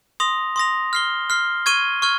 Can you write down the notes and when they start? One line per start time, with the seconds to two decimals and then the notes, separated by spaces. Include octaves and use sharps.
0.20 C6 D#6 A#6 F7
0.56 C6 D#6 A#6 F7
0.93 F6 C7 G7
1.30 F6 C7 G7
1.66 C#6 F6 G#6 D#7 G7
2.02 C#6 F6 G#6 D#7 G7